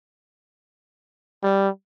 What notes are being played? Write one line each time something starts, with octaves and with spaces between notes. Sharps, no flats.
G3